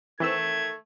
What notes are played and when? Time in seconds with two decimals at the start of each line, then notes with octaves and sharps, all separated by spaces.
0.20 D#3 E3 A3 C4 E6 G#6